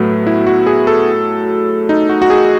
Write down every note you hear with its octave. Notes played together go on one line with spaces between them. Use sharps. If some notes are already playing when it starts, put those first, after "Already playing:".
Already playing: A2 F#3 A3 B3
E4
F#4
G#4
A4
D#4
F#4
F#4
G#4